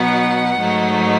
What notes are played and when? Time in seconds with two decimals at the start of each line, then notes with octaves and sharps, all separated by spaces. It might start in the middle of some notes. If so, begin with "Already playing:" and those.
Already playing: B2 F#3 B3 D#4 F#5
0.59 G#2 F#3 A3 D#4